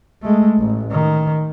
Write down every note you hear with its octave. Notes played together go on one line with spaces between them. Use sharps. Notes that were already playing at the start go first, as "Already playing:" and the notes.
G#3 A3
A1
D#3